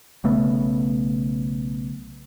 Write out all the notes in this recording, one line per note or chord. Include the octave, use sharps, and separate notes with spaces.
B1 C#3 A3 B3